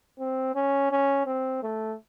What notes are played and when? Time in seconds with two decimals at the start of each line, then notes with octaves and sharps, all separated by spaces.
0.19 C4
0.55 C#4
0.91 C#4
1.26 C4
1.63 A3